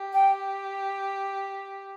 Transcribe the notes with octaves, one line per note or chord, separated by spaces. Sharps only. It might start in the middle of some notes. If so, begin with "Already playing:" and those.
Already playing: G4
G5